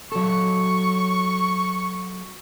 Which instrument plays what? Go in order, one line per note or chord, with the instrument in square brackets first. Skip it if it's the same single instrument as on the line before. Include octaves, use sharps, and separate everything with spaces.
[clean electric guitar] F#3 A4 [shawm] C#6